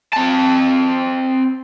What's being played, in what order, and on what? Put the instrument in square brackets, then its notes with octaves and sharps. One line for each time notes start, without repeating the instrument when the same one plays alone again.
[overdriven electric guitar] C4 A5